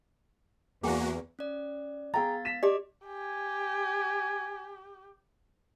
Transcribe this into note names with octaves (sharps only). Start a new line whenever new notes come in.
E2 A#3 F#4 G#4 G5 G#5
C#4 D5
B3 G#4 F5 G5 A#5 A6
B6 E7
G4 D5 D#5 D6
G4 G#5